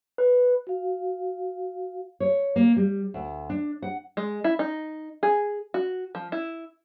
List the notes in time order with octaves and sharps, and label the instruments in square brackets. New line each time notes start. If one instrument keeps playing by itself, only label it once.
[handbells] B4
[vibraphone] F#4 F5
[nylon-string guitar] C#5
A#3
G3
D2
D4
F#5
[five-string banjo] G#3
E4
D#4
G#4
F#4
F3
E4